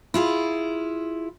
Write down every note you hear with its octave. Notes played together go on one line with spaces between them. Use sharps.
E4 F4 G#4